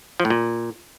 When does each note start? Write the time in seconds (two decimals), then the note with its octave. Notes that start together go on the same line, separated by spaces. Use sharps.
0.20 F3
0.25 A2
0.30 A#2